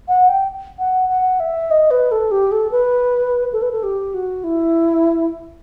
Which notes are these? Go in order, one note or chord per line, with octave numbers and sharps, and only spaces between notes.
F#5
G5
F#5
F#5
E5
D#5
B4
A4
G4
A4
B4
A4
B4
A4
G4
F#4
E4